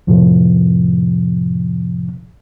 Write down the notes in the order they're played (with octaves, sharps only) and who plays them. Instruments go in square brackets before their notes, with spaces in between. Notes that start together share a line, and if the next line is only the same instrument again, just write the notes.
[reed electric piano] F2 A2 C3 F3